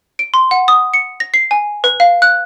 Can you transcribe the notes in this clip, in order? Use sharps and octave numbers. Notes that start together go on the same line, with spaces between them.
D7
C6
F#5
D#6
C#7
A#6
C7
G#5
B4
F5
F#6